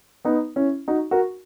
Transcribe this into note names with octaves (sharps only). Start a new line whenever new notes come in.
B3 D#4
C#4 E4
D#4 F#4
F#4 A#4